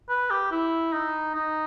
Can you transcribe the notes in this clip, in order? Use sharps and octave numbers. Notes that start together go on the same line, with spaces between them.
B4
G4
E4
D#4
D#4